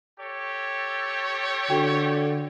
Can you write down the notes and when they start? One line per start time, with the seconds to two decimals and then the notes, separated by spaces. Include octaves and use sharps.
0.19 G4 A4 C#5
1.70 D3 F#4 G5 C#6